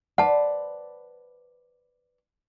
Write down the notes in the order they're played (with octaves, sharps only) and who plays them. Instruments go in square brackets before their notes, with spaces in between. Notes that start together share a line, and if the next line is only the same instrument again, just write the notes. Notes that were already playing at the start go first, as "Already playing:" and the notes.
[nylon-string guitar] B4 C5 D5 [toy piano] F#5 A5